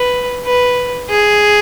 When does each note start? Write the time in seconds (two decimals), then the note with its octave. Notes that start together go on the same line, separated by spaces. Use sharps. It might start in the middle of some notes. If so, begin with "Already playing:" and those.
Already playing: B4
0.45 B4
1.10 G#4